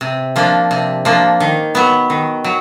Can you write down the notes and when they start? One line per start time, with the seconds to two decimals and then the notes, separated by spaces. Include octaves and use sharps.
0.01 C3
0.36 F3 A#3 D4
0.71 C3
1.05 F3 A#3 D4
1.40 D#3
1.75 F#3 B3
2.10 D#3
2.44 F#3